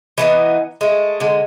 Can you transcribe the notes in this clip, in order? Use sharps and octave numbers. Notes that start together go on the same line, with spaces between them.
E3 A3 B3 D#4
G#3 A3
D3 G#3